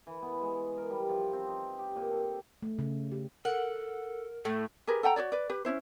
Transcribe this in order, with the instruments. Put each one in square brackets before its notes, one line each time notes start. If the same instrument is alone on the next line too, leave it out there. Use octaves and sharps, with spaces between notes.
[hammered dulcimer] E3
B3
G#3
A#4
G3
F3
C4
D#4
G4
A#2
A4
[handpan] A3
C#3
G4
[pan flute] A4 [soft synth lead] A#4 [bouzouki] F#5
[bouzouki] A2 [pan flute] A3 [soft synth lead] A4
[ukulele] G4 G#4 A#4 B4
A4 F#5 G5 A#5
F#4 A4 C#5 D5
B4 D5
G4 B4
C#4 D4 E4 C5